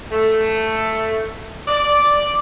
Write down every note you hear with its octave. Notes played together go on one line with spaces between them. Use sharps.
A3
D5